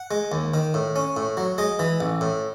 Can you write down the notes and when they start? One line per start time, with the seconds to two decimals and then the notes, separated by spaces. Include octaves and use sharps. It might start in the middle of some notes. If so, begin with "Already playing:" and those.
Already playing: F#5
0.11 G#3
0.32 D#2
0.54 D#3
0.74 A2
0.96 C#4
1.17 A2
1.37 F#3
1.58 G#3 D#5
1.79 E3
2.00 A1
2.21 A2